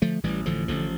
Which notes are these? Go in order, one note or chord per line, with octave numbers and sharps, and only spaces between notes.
D3 F3 A3
A1 E3 G3
A1 D3 F3
A1 D3 F3